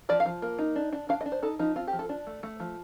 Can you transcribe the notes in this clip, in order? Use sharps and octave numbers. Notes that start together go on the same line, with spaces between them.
F3 D5
F5
F3
A#3
D#4
D4
D4
D4 F5
D#5
D4
C5
D#4 A4
F3 D#4
C4 F4
G4
F3
A4
D4
A3
A3
F3